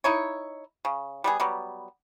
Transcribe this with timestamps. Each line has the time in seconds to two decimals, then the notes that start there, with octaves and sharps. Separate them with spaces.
0.04 D#4 E4 C#5
0.85 C#3
1.24 G3 B3 G#4
1.40 F#3 G3 B3